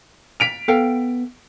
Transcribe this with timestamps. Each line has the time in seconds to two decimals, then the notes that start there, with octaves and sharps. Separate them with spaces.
0.40 B6 D7 F7
0.68 B3 A4 F5 G5